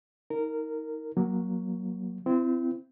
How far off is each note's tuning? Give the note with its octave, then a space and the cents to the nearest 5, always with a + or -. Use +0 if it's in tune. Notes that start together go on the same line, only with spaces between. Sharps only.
D#4 +25 A#4 -15
F#3 +0 A#3 +20
C4 -25 E4 +35